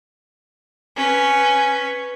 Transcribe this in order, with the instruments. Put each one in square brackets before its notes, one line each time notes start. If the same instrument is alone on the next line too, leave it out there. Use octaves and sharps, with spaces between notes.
[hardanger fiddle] C#4 B4